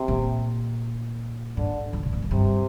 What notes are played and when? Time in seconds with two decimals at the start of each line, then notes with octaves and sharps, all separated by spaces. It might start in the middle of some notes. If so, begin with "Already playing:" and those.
Already playing: C3
0.08 A#2
1.57 G#2 D3
1.93 D3
2.03 C3
2.13 A#2
2.22 G#2
2.31 G2 C3